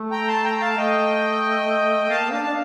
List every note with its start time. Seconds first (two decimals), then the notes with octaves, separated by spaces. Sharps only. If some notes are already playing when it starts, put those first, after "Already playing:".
Already playing: A3
0.11 G5 A#5
0.28 A5 C6
0.44 G5 A#5
0.61 F5 A5
0.77 A3 D#5 G5
2.10 A#3 F5 A5
2.32 D4 F5 A5
2.44 D4 A5